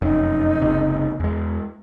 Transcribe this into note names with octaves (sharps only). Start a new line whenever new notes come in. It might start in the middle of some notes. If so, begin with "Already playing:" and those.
F1 F#2 D#4
F#1 C#2 C3
E2 G#3